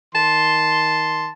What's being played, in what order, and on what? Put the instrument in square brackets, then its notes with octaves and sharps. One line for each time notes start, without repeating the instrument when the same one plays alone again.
[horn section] D#3 A5 C6